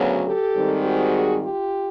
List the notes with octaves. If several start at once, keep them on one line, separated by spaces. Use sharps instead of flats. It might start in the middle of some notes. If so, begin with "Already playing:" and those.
Already playing: D2 C#3 F#3 B3
G4 A4
G#2 D#3 G3 C4
F#4 G#4
F4 G4